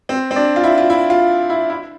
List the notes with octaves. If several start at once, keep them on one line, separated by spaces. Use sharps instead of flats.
C4
C4
D4
F4
E4
F4
E4
F4
E4
E4